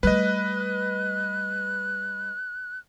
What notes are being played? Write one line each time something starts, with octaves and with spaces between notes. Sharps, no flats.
G3 A3 B4 D#5 F#6